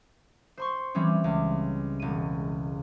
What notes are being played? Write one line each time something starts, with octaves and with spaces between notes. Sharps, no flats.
C5 C6 C#6
E3 G3 C4 C#4
C#2
E1 D#7